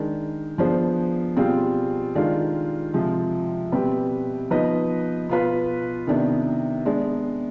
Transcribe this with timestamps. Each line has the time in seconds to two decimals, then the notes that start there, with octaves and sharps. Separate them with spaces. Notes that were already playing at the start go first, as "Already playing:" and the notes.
Already playing: D#3 G#3 D4
0.58 F3 B3 D4 G#4 C5
1.36 B2 G3 C4 F4 G#4
2.15 D#3 G#3 D4 F4
2.93 C3 F3 G#3
3.72 B2 G3 C4 G4 B4
4.50 F3 B3 D#4 B4 D#5
5.29 B2 B3 F4 B4
6.07 C3 D#3 B3 D4
6.85 G#3 B3 D4